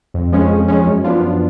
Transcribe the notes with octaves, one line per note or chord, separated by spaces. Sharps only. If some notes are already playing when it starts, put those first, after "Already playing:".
F2
F3 G#3 C#4
F2
F3 G#3 C#4
F#2
F3 B3 D4 F4
F#2